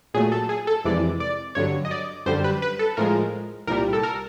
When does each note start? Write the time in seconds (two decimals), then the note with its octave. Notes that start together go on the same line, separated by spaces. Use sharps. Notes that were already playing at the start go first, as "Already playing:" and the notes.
0.14 A#2 F#3 A3 G#4
0.32 A4
0.49 G#4
0.67 A4
0.85 F2 C3 E3 G#3 D5
1.20 D5
1.55 G2 D3 F#3 C#5
1.85 D#5
1.91 D5
2.26 F#2 D3 G3 C5
2.44 B4
2.62 B4
2.79 A4
2.97 A2 F3 G#3 A#4
3.67 C2 A#4
3.70 A#2 G3
3.93 A4
4.03 A#4